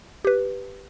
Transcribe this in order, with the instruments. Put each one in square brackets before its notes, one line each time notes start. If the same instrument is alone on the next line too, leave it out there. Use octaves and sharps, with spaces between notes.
[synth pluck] G4 B4